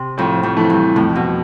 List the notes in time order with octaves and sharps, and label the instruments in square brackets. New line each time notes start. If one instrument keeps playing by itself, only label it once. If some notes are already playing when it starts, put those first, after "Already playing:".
Already playing: [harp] C3
[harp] F2 [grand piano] A2
[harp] F2
[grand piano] E3 A3
[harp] G2
[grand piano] F2 [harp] A2
[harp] B2